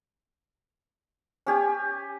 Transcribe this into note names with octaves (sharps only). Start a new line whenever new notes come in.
C#4 G4 G#5